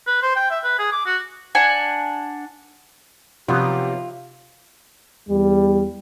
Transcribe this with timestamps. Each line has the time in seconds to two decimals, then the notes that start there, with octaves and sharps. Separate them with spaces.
0.07 B4
0.23 C5
0.36 G5
0.51 E5
0.64 B4
0.79 G#4
0.92 D6
1.06 F#4
1.55 D4 F#5 G#5
3.48 C3 F3 F#3 B3 D#4 F4 G4
5.29 E2 G3